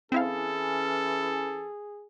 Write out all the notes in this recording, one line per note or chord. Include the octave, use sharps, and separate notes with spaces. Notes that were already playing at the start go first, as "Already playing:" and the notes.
E3 C4 C#4 E4 G#4 A4 F5